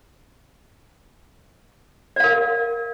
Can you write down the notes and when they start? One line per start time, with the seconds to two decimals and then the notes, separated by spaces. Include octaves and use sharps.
2.16 D5
2.20 F5
2.24 A#4